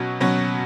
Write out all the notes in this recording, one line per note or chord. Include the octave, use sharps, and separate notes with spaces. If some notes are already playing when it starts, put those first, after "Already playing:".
Already playing: B2 F#3 C#4 F#4
B2 F#3 C#4 F#4